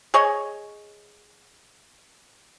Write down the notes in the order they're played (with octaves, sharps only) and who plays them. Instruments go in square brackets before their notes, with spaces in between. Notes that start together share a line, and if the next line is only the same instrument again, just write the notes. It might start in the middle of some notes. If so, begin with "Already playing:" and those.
[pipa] G#4 C#5 D#5 G#5